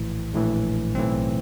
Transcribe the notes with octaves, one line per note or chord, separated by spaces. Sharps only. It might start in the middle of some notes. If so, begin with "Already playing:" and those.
Already playing: A#1 A2 E3
A#1 A2 E3
B1 A2 E3 C4